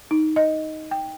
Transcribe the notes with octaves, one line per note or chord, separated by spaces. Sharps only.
D#4
D#5
G5